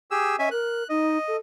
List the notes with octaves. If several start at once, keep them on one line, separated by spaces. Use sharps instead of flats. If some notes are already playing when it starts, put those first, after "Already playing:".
G4 G#4 E6
C#4 D#5 E5 G#5
A#4 F#6
D#4 D#5
A4